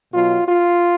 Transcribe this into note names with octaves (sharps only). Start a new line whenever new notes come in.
B2 F#3 F4
F4